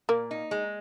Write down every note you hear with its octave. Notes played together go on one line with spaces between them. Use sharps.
A#2 A#3
D#4
G#3